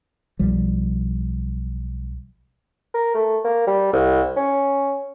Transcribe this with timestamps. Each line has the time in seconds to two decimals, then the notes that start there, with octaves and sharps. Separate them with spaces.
0.39 B1 F3 G3
2.94 A#4
3.15 A3
3.45 A#3
3.67 G3
3.93 C2
4.37 C#4